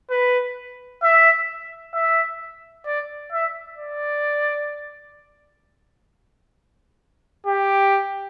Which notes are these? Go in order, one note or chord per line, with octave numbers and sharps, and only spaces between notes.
B4
E5
E5
D5
E5
D5
G4